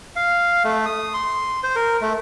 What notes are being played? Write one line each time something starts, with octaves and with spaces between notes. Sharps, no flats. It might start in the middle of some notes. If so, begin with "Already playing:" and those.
F5
A3
D#6
C6
C5
A#4
A3